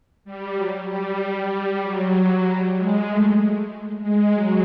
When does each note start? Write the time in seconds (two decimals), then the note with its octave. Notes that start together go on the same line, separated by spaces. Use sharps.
0.25 G3
0.56 F#3
0.88 G3
1.19 G3
1.82 F#3
2.45 G3
2.77 G#3
3.08 A3
4.02 G#3
4.34 F#3